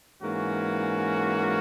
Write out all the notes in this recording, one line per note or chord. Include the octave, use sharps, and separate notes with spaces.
G#2 E3 A#3 C#4 F#4